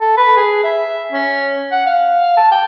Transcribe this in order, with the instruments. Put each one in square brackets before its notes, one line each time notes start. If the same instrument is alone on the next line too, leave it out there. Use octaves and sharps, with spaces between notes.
[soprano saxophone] A4
B4
G#4
E5
C#4
F#5
F5
A5
G5